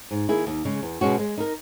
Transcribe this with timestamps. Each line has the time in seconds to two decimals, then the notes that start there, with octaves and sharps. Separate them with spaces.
0.11 G#2
0.29 D#3 A#3 E4 G#4
0.47 D#2
0.65 C#3 G#3
0.83 E2
1.01 B2 G#3 C#4 F#4
1.19 G#3
1.38 D#4 A#4